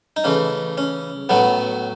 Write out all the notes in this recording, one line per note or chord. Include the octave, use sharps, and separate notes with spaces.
D#4
C#3 E3 A3 C#4
C#4
A2 F#3 A3 B3